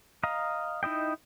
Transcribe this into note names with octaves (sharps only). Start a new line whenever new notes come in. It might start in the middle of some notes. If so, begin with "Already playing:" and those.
D#5 F5 A#5
D#4 E4 D#5 G5